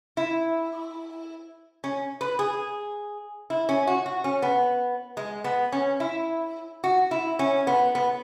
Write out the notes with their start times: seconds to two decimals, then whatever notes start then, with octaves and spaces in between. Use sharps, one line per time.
0.17 E4
1.84 C#4
2.21 B4
2.39 G#4
3.50 E4
3.69 C#4
3.87 F#4
4.06 F#4
4.24 C#4
4.42 B3
5.17 G#3
5.44 B3
5.72 C#4
6.00 E4
6.84 F#4
7.11 E4
7.39 C#4
7.67 B3
7.95 B3